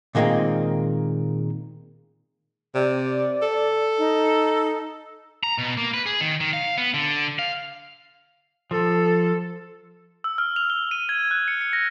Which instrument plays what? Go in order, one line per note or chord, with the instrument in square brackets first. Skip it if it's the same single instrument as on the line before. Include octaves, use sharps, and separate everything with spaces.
[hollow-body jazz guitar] A#2 D#3 G#3 A#3 C4
[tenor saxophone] C3 [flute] D5
[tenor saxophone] A4
[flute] D#4
[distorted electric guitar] A#5
B2
A#3
B4
G#4
D#3
D#3
F5
B3
D3
F5
[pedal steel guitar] F3 [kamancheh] A4
[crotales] E6
F6
F7
G7
D#7
G#6
F#6
C#7
C#7
A#6